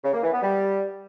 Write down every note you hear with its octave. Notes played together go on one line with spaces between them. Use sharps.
C#3
A#3
E3
B3
G3